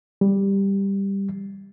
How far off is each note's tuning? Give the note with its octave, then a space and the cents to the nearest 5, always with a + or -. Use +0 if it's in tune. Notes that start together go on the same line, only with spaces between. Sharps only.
G3 +10